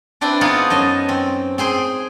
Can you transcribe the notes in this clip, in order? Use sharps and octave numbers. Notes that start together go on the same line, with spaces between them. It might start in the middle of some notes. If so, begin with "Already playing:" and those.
C4 D4 E4 B4 G5
B3 D#4 F4 G#4
F#2 D#5 A5
C4
C4 G#4 C5 G5